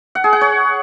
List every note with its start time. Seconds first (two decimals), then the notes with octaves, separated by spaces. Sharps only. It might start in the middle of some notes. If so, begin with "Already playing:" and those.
0.15 F#5
0.24 G#4
0.33 F#5
0.41 C#5